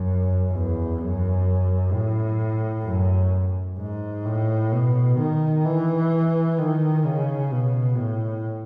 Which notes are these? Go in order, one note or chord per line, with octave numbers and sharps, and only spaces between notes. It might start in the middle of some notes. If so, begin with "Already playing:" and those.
Already playing: F#2
E2
F#2
A2
F#2
G#2
A2
B2
D#3
E3
D#3
C#3
B2
A2